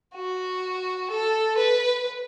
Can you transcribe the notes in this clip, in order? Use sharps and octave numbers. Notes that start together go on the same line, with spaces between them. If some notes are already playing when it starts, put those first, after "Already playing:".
F#4
A4
B4